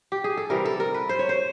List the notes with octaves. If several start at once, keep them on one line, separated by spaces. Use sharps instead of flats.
G4
G#4
A4
C3 E3 G3 A#4
A4
A#4
B4
C5
C#5
C5